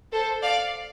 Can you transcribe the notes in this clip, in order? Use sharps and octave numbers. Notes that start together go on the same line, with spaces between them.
A4 C5
D5 F5